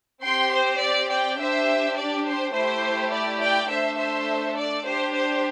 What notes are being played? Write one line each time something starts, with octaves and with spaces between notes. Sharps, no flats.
C4 G4 G5 C6
C5
D5
D5 G5
D4 G4 C5 E5
D5
C5
A3 E4 G4 C5
D5
D5 G5
A3 D4 A4 C5 E5
C5 E5
D5
D4 G4 C5
C5